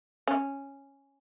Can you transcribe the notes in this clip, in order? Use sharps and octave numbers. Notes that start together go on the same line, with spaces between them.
C#4